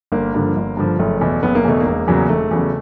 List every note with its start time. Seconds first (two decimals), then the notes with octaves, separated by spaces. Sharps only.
0.12 G1 A#3
0.34 G2 D3 F3
0.56 G1
0.77 G2 D3 F3
0.99 F#1 A3
1.21 E2 B2
1.43 F#1 B3
1.55 A#3
1.65 E2 B2 A3
1.80 A#3
1.86 E1
2.08 E2 C#3 F#3
2.29 E1 A3
2.51 E2 C#3 F#3